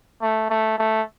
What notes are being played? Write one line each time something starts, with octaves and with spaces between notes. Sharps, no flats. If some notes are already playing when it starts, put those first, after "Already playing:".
A3
A3
A3